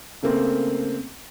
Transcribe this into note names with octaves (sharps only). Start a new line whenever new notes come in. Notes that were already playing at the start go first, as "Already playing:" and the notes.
C#3 A3 A#3 C4